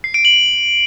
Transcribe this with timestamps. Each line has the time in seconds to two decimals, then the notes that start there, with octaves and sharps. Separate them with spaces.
0.04 C7
0.14 D7
0.25 F#7